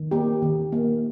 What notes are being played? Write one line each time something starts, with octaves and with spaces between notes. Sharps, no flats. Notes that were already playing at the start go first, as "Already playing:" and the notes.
Already playing: D#3
A#3 G4
D#3
A#3